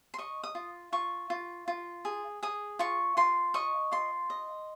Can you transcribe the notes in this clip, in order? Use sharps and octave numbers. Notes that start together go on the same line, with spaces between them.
C6
D#5 C#6
D#6
F4
F4 C#6
F4
F4
G#4
G#4 D#6
F4 C#6
F4 C6
D#5 C#6
F4 C6
D#5